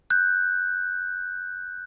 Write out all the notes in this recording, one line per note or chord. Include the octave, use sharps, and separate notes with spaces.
F#6 G6